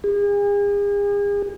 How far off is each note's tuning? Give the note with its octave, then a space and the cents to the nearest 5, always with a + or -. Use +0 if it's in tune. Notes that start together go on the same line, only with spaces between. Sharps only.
G#4 -40